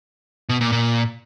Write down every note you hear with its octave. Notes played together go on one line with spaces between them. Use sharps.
B2
A#2
A#2